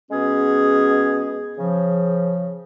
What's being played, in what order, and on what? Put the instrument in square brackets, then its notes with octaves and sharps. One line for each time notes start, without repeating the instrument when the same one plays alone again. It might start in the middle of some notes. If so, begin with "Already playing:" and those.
[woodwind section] B2 G#3 B3 C#4 G#4
C#3 F3